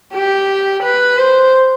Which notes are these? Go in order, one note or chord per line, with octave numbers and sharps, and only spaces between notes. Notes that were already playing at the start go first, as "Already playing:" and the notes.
G4
B4
C5